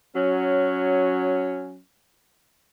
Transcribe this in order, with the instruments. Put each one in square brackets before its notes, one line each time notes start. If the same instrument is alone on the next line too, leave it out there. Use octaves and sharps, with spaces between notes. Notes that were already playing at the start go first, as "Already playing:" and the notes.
[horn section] F#3 C#4